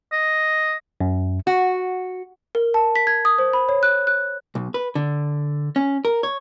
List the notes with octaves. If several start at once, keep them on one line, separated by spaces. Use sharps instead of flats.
D#5
F#2
F#4
A#4
A5
B6
G#6
D#6
C5
B5
C#5
F#6
F#6
B1
B4
D3
C#4
A#4
C#5